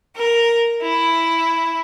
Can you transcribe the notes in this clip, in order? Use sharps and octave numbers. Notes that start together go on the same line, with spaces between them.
A#4
E4